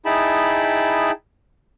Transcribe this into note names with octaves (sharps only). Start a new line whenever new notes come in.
D#4 E4 G#4 G5 A5 B5